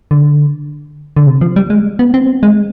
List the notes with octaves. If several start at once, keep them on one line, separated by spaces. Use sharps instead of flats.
D3
D3
C3
F3
G3
G#3
B3
C4
G#3